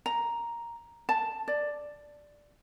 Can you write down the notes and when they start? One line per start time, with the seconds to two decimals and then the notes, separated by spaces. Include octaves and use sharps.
0.06 A#5
1.09 A5
1.48 D5